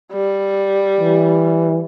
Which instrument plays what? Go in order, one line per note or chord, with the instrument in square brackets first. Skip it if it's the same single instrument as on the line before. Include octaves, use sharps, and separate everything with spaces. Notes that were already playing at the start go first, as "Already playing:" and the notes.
[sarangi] G3
[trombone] E3